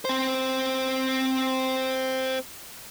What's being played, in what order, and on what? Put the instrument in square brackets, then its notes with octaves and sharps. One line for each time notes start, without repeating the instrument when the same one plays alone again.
[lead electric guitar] C4 C5